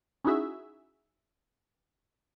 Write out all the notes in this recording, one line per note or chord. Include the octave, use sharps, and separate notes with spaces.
C#4 D#4 E4 F#4 G#4 E5